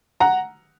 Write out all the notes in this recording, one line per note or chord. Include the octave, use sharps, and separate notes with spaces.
F#5 A#5